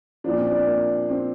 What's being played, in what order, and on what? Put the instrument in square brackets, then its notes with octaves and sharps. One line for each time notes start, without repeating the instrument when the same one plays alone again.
[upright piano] A#2 F3 D4
C4
D4
A#3
C4